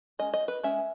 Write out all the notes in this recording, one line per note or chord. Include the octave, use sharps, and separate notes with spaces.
G#3 C#4 D#5
D#5
B4
G#3 C#4 E5